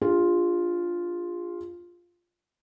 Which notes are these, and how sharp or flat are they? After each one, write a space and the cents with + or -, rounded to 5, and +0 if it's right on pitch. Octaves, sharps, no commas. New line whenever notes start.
D4 +0 F4 +0 G#4 -40